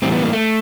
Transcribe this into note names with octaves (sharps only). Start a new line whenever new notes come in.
A2 E3 G3 C4
B3
A#3
A3